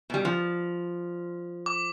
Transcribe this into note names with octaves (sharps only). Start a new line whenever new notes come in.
B2 G3
F3
D6